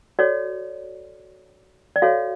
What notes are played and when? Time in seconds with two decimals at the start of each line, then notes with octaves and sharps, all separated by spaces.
0.19 F#4 A4 C#5 D5
1.96 D5
2.02 F#4 A4 C#5 F5